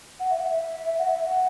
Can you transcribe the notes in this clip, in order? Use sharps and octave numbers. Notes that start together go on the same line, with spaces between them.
F#5
E5
F#5
E5
F#5
E5
F#5